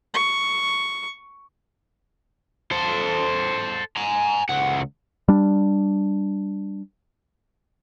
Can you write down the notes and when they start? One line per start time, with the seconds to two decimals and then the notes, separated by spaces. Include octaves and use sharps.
0.14 C#6
2.71 A4 C5
3.97 G#5 A#5
4.49 C#2 F#5
5.28 G3 D4